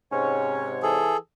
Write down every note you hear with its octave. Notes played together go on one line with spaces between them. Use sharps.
G#2 C3 C#4 C#5
E3 G#4 A4